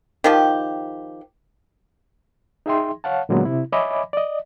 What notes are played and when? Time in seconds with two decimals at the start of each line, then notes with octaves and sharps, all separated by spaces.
0.24 D#3 F3 G4
2.66 D#4 G#4 E5 G5 C6
3.04 C#5 F5 F#5 A5
3.29 A#2 D3 F#3 G#3 A#3 B3
3.45 C3 E4
3.72 C#5 D#5 E5 G#5 B5 D6
4.13 D5 D#5